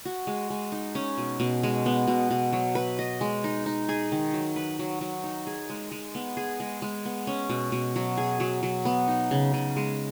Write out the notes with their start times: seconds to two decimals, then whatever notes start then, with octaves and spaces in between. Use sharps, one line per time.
0.05 F#4
0.27 G#3
0.50 G#3
0.72 D#4
0.95 C#4
1.18 B2
1.40 B2
1.63 G#3
1.86 B3
2.07 B2
2.30 B2
2.53 F#3
2.75 B4
2.99 D#5
3.21 G#3
3.44 D#4
3.66 D#4
3.89 G#4
4.12 D#3
4.33 F#3
4.56 B4
4.79 F#3
5.01 F#3
5.24 D#4
5.47 G#4
5.70 G#3
5.91 G#3
6.15 B3
6.37 G#4
6.60 G#3
6.82 G#3
7.05 B3
7.27 C#4
7.49 B2
7.72 B2
7.96 F#3
8.17 G#4
8.40 F#3
8.63 F#3
8.85 B3
9.08 D#4
9.31 C#3
9.54 C#3
9.76 G#3